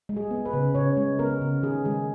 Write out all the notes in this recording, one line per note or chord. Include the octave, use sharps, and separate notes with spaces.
G#3
G#4
B3
B4
C#3
C#3 C#5
G#3
B3 A#4
C#3
D#3 G#4
G#3 G#4